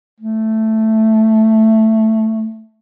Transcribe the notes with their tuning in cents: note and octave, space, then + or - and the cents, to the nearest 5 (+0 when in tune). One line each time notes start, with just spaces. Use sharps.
A3 +5